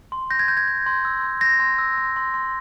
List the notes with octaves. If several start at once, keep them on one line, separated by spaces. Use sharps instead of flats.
C6
G6 A#6
G#6
G6
G#6
G6
C6
E6
C6
G6 A#6
C6
E6
C6
C6
C6